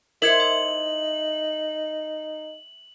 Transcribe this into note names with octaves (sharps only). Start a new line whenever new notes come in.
D#4 E4 A#4 C5 G#6 C#7 F#7
E5